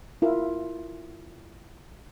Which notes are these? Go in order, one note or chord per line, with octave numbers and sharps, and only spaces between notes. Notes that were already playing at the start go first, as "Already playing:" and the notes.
E4 F4 A#4